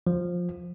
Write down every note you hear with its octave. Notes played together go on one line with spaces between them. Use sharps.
F3